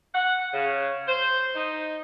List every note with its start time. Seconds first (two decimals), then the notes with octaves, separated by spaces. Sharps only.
0.15 F#5
0.53 C#3
1.08 C5
1.55 D#4